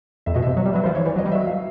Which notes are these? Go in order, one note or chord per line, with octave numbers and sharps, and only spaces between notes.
F2 E5
B2 D#5
C3 E5
F#3
G3
F#3 B4
F3 C5
E3 C#5
E3 D5
F#3 D#5
G3
F#3 E5
F5